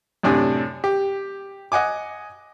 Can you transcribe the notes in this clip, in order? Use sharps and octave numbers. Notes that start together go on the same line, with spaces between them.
F#2 A2 C3 D4 G#5
G4
D#5 F#5 G#5 D6